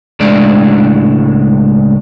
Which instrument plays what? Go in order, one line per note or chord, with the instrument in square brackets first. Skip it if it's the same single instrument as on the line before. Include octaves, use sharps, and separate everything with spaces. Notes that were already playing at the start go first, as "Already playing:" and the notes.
[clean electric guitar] C#2 A2 G#3 D4 D5